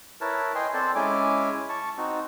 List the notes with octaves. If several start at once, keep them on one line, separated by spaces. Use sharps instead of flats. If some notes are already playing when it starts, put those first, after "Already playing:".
E4 A#4 B4 C#5 A5
D#5 G5 G#5 C6
C4 A4 C5 D5
G#3 C#4 E4 G#5 D6
A5 C#6
C4 D#4 F#4